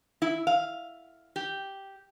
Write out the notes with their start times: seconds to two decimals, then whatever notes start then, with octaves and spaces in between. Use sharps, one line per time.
0.22 E4
0.47 F5
1.36 G4